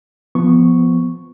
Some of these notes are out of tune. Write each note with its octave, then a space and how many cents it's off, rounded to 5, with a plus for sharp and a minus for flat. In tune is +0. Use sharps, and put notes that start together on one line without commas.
F3 +0 B3 +0 C#6 +0